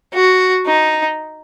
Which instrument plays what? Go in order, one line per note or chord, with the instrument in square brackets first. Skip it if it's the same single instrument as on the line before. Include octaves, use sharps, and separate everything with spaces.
[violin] F#4
D#4